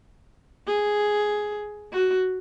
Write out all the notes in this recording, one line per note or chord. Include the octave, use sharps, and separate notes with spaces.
G#4
F#4